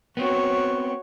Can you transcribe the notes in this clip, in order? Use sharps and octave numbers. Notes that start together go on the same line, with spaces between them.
B3 C4 F#4 C#5